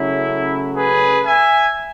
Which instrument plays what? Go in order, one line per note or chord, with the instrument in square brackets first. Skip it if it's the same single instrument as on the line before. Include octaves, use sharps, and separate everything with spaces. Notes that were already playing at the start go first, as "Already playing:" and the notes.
Already playing: [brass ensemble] C#3 F#3 A3 C#4 E4
G#4 B4
E5 G#5